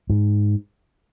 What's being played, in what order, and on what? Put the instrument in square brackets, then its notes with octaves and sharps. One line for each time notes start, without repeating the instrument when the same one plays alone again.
[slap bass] G#2